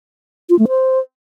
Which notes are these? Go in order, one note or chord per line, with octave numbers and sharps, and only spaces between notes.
F4
A3
C5